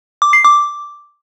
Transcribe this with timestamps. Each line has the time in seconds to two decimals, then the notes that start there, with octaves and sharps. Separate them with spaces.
0.22 D6
0.33 C7
0.44 D6